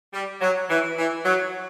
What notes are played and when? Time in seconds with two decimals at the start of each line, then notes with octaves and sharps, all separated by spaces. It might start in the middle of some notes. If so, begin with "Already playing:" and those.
0.14 G3
0.41 F#3
0.70 E3
0.98 E3
1.25 F#3